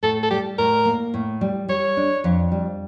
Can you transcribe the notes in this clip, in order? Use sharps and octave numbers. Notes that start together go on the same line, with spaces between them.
A2 A4
A4
G3 G4
A2 A#4
A#3
A2
G3
G3 C#5
D4
F2
G3